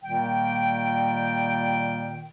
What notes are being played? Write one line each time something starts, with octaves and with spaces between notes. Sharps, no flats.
A#2 D#3 G3 A#3 G5